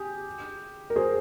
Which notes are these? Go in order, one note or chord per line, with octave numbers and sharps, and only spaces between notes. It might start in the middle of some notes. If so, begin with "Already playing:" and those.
Already playing: G4 G#4
A#4
G#4 C5